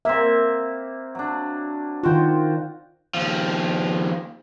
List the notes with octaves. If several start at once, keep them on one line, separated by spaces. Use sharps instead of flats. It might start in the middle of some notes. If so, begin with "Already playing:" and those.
A#3 C4 E5
F#3 D4
D#3 F4 F#4 C5 G5
D#2 F3